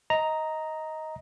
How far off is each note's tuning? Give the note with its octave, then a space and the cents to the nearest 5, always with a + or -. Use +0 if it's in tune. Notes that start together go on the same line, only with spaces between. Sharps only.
D#5 +15 A#5 +0